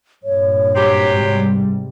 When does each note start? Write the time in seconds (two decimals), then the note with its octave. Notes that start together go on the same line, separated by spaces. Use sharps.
0.24 G2 A#2 C#5
0.76 F#3 C4 G4
1.13 G#2 C3 G3